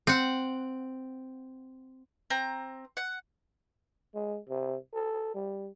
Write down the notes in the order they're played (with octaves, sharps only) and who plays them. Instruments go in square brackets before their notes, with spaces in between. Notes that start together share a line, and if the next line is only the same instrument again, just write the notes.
[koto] C4 F#5
[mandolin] C4 A#5
F#5
[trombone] G#3
C3
A4
G3